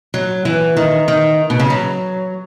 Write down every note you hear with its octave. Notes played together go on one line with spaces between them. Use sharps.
F#3
E3
D#3
D#3
B2
C#3
F#3